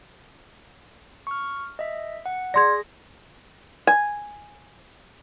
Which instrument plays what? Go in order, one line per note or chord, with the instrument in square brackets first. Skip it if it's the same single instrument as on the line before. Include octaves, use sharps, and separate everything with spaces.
[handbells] C#6 F6
D#5 E5
F#5
[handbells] G#4 A#6 [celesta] D5 C6 G#6
[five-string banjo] G#5